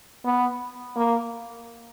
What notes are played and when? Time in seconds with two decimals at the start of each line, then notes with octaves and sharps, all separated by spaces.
0.25 B3
0.96 A#3